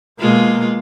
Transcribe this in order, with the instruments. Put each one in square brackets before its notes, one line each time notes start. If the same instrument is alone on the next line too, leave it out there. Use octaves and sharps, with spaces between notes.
[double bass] B2 A#3 [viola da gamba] G#3 F4